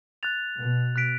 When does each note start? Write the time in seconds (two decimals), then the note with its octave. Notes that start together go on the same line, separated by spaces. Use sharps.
0.23 F#6 A6 F7
0.59 B2
0.96 F#6 B6 D7